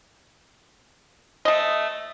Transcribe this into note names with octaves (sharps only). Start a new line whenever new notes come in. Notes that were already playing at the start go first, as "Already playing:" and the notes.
A3 D#5